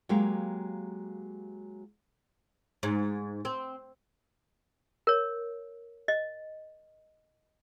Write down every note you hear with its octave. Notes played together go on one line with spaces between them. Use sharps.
F#3 G#3 A#3 G4 F5
G#2
C4
A#4 C#5
D#5